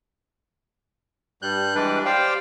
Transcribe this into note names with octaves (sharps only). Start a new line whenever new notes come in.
G2 G3 F#6 G6
E3 G3 G#3 D4 B4 D5
G4 C5 D5 F5 G5